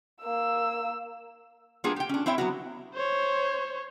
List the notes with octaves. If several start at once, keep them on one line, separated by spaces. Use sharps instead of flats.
A#3 E6
G3 A#3 B3 D4 F4 G#4
G4 G5
C#4 D4
C4 E4 C#5 E5 G5
F#3 B3 F#4
C5 C#5